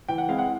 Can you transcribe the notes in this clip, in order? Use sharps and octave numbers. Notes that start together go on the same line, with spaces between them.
E3 G5
F#5
G#3 C4 E4 F5
F#5